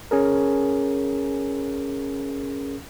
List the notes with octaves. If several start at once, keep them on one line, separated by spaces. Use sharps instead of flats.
C#4 G#4 A#4